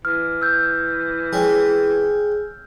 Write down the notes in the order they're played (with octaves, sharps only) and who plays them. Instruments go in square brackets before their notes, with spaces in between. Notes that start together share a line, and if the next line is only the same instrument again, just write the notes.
[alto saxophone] E3 [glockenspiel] F6
[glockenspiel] E6 G6
[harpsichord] G#3 C#4 G4